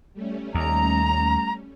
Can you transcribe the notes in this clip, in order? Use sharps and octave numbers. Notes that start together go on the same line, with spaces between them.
G3 A3 C#4
D#2 A#5